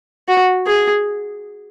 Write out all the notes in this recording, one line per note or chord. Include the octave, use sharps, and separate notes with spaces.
F#4
G#4